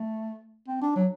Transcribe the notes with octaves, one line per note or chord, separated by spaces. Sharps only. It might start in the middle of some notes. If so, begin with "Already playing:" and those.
Already playing: A3
C4
D4
F#3